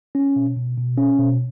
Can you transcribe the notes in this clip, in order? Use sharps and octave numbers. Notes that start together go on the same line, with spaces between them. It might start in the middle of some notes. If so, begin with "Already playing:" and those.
C#4
B2
B2
B2
C#4
B2